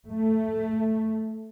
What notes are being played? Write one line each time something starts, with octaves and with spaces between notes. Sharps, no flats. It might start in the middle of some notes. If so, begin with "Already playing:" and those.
A3